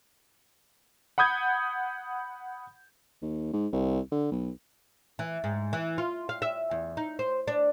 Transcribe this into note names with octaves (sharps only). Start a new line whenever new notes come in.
F#5 B5 D#6 G6 G#6
D#2
G#2
C2
D3
B1
E3
G#2
E3
F4
F5
E5
E2
D#4
C5
D4